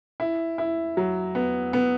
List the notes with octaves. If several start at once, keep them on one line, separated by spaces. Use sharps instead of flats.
E4
E4
F#3
B3
B3